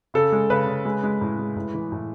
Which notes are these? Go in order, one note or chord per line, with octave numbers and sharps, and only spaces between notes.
C#3 A4
G#3
C#3 B4
C#3
G#3
G#3
A2
G#3
A2
E3
A2